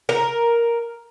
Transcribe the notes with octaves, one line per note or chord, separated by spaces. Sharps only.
A#4